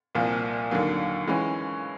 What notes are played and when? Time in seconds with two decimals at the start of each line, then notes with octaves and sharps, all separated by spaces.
0.15 C2 A#2 F3 A#3
0.71 D#2 D3 F#3 A#3
1.27 E3 G#3 C#4